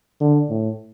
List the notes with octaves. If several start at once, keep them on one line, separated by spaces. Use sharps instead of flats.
D3
A2